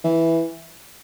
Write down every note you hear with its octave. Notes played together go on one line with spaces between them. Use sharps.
E3